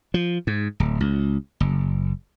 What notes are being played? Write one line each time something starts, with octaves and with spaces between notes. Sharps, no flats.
F3
G#2
D1
C#2
F#1